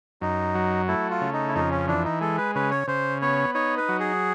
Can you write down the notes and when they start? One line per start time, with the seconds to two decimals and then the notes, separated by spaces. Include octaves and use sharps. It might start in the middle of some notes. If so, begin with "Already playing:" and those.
0.21 F#2 D#4
0.55 F#3
0.88 A3 E4
1.10 F4
1.21 C#3
1.33 D#4
1.48 E4
1.54 F2 D#4
1.71 C#4
1.88 E3 D4
2.04 D#4
2.21 G#3 A4
2.38 B4
2.55 C#3 B4
2.71 C#5
2.88 C#3 C5
3.21 B3 C#5
3.55 D#4 C#5
3.77 B4
3.89 F#3
4.00 G#4